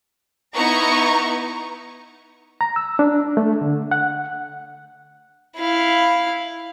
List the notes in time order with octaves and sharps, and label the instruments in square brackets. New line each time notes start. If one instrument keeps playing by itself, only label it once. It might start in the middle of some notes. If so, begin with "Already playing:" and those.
[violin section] B3 D#4 E4 A#5 C#6
[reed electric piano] A#5
E6
D4
A3
D3
F#5
[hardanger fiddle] E4 F5